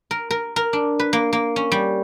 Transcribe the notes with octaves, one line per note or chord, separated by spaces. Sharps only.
A#4
A#4
A#4
D4
B4
A#3
A#3
C#4
G3